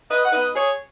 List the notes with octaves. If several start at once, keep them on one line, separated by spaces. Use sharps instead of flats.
B4 D#5
F#5
B3 D#4 B4 D#5
G#4 C#5